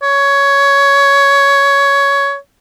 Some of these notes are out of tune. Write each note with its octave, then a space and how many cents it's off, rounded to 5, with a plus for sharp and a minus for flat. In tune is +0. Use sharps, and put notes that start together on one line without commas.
C#5 +15